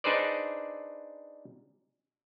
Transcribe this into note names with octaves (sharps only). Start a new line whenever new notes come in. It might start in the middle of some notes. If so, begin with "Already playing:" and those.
D4 D#4 G#4 B4 C5 D5